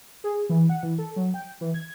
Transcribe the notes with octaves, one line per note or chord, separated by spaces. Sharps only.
G#4
E3
F#5
E3
A4
F#3
G5
E3
G#6